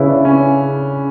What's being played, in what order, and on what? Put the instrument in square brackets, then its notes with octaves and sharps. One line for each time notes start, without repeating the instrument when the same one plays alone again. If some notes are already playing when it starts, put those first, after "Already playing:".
Already playing: [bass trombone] C#3 [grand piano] E4 B4
[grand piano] D4
C#4